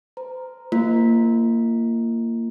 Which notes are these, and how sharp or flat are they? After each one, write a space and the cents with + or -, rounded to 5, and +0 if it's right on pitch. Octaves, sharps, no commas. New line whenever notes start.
C5 -35 A#5 +0
A#3 -20 F4 -35